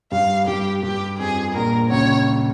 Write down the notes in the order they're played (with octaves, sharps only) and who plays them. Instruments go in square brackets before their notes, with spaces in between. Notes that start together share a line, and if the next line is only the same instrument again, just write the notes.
[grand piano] G2 G3 [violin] F5
[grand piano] G2 G3 [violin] G4
[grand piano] G2 G3 [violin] G4
[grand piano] F2 F3 [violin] G#4
[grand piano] A#1 A#2 [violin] A#4
[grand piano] C#2 C#3 [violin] C#5